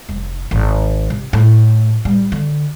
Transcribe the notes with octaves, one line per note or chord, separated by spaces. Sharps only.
F1
G#1
C3
A2
G3
D3